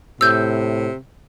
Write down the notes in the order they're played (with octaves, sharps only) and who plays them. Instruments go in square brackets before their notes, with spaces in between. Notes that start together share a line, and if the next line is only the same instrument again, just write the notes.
[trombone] A2 [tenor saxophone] C3 [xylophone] E6 G6